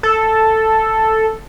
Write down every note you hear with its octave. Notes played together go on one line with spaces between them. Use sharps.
A4